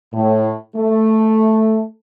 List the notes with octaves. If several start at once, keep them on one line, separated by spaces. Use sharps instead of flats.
A2
A3